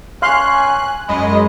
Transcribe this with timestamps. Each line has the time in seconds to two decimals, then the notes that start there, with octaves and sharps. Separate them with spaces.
0.22 C#4 F5 G#5 C6 F#6
1.08 F#2 G#3 D#5 B5